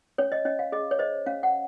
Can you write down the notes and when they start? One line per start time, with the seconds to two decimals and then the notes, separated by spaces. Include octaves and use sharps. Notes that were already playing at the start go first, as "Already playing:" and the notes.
0.18 C#4 C#5
0.32 D#5
0.45 C#4 D#5
0.59 F5
0.72 G#4 D#5
0.91 C#5
0.99 C5 D#5
1.26 C#4 F5
1.43 F#5